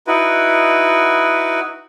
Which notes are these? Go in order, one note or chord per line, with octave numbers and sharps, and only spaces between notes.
D#4 E4 F#4 B4